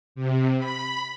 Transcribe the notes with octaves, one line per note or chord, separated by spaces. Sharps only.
C3
B5